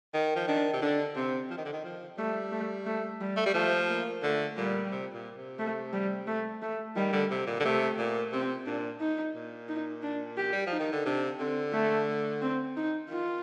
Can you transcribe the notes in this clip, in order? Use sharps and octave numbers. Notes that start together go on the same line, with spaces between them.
D#3
F3
D#3 D4
C3
D3 D4
C3 C4
F3
D#3
D3
D#3
F3
G3 A3
A3
A3
G3
A3
G3
F3 A3
A#3
D3 A3
A#2 G3
C3
A#2
C3
A3
G3
A3
A3
D#3 G3
D3
C3
A#2
D3
C3 A3
A#2
C3 C4
A#2 D4
D#4
A#2
D#4
D4
G4
G3
F3
D#4
D#3
D3
C3 D4
D3 C4
A3
C4
D#4
D#3 F4